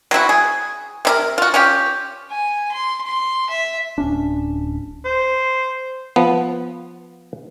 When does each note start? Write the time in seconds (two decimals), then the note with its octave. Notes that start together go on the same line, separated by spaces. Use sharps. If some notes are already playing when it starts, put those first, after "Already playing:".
0.11 F#3 C4 E4 F#4
0.29 G#4
1.05 C3 E4 A#4
1.38 F4 F#4
1.54 C#4 F4 G4
2.31 G#5
2.72 C6
3.06 C6
3.50 E5
3.98 D1 C#4 D4
5.05 C5
6.16 F3 B3